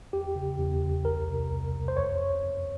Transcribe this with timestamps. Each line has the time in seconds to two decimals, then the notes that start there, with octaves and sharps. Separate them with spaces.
0.13 E2 G4
0.36 C#3
0.58 E2
0.82 E2
1.04 C2 A#4
1.28 C3
1.50 C2
1.74 C2
1.88 C5
1.97 F2 C#5
2.20 F2
2.43 F2